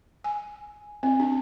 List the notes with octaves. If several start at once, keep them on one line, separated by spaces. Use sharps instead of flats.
G#5
C4
D4